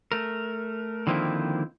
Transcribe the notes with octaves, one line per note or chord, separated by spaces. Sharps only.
A3 A#4
D3 D#3 F3 A#3 C4 E4